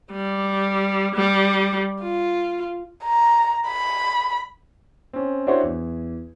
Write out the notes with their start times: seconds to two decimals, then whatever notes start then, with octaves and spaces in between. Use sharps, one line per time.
0.12 G3
1.15 G3
2.01 F4
3.04 A#5
3.67 B5
5.13 C4 C#4
5.47 D4 E4 F#4 G4 C5 C#5
5.63 E2